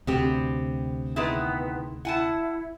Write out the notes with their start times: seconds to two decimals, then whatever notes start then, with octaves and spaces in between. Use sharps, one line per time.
0.07 D2 C3 B3 C4 G4
1.16 D#3 G#3 B3 E4
2.05 E4 F#5 G#5 A5